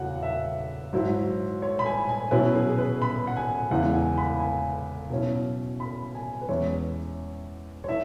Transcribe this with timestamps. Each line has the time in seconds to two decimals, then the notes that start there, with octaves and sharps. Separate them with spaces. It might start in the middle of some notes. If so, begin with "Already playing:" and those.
Already playing: E2 C#3 F#3 F#5
0.22 E5
0.93 G#2 F#3 E4
1.62 C#5
1.79 B5
1.86 G#5
2.09 G#5
2.31 B2 F#3 C#4 E4 B4
2.55 G#4
2.69 G#4
2.78 B4
3.02 B5
3.27 F#5
3.37 G#5
3.71 E2 C#3 G#3 E4 F#5
3.83 F#5
3.94 G#5
4.18 B5
4.40 G#5
5.10 B2 F#3 C#4 E4
5.80 B5
6.15 G#5
6.41 B4
6.48 E2 E3 G#3 C#4 E4 C#5
7.84 C#5
7.88 E4 E5